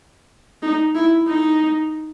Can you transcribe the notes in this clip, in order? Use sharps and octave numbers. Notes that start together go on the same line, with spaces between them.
D#4
E4
D#4